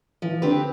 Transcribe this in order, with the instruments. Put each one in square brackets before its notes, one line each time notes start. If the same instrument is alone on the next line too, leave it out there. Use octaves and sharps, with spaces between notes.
[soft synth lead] E3 [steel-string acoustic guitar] F3
[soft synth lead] D3 [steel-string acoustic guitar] C4 G4 B4